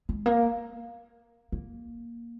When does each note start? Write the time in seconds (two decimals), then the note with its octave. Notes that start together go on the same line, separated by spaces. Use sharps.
0.09 G#3
0.26 A#3
1.52 A#3